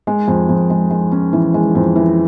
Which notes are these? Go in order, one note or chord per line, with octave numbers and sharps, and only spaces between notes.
G#3
F2
F2
G#3
G#3
C#4
E3
G#3
F2
E3